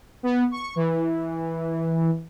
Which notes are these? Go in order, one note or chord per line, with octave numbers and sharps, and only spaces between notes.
B3
C#6
E3